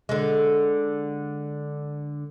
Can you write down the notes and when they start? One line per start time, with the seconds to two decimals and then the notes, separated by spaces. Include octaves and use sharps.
0.09 D3 G#3